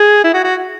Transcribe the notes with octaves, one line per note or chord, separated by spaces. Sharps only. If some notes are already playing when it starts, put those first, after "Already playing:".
Already playing: G#4
E4
F#4
F#4